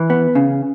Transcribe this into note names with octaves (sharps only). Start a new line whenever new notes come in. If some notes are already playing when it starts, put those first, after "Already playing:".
Already playing: E3
B3
C#3